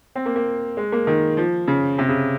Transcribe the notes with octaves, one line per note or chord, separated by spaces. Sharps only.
C4
A#3
A#3
G#3
A#3
D#3
F3
C#3
C3
C#3